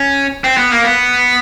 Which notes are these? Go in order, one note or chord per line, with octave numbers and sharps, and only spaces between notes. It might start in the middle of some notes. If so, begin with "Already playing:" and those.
Already playing: C#4
C4
B3
A#3
B3